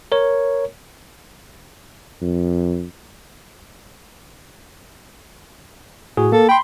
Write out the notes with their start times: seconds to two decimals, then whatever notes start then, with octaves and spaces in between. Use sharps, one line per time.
0.12 A#4 C#5
2.21 F2
6.17 A2 F#4 G#4
6.32 A#3 A4
6.49 G5 B5 C6